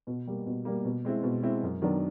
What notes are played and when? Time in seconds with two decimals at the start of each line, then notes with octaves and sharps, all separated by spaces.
0.07 B2
0.27 G3 A#3
0.46 B2
0.65 G3 A#3
0.85 B2
1.05 G#3 C4 E4
1.23 B2
1.42 G#3 C4 E4
1.63 F#2
1.82 D#3 F#3 B3 D4